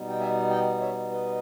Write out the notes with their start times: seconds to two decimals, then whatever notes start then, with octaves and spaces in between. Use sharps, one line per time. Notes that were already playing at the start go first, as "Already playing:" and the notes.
Already playing: B2 G3 B3 D#4
0.08 G5
0.20 E5 G#5
0.50 D#5 G5
0.81 C#5 E5
1.11 B4 D#5